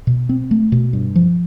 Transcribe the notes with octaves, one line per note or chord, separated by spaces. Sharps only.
B2
C4
A3
B2
G2
F3